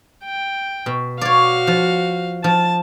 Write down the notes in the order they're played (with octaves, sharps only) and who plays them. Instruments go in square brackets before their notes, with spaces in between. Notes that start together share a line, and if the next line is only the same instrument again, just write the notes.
[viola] G5
[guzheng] B2
[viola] F#4 F5 [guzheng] C#5 D5
[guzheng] F3
[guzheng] F3 [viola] A5